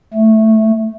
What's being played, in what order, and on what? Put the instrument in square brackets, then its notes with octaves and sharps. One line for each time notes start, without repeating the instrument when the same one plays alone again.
[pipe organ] A3